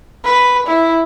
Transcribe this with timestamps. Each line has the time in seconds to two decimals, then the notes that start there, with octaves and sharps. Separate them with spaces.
0.24 B4
0.66 E4